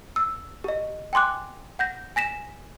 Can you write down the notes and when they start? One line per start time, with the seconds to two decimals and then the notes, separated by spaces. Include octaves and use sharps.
0.16 E6
0.64 G4 D#5
1.13 G5 G#5 C6 D6 F#6
1.79 F#5 G6 A#6
2.16 G#5 A#6 B6 E7